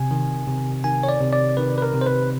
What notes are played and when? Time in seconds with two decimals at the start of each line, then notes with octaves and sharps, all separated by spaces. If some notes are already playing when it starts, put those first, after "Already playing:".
Already playing: C3 G#5
0.11 D#3
0.47 C3
0.84 D#3 G#5
1.03 C#5
1.09 D5
1.20 C3
1.33 D5
1.57 D#3 B4
1.78 B4
1.82 A#4
1.94 C3
2.01 C5
2.07 B4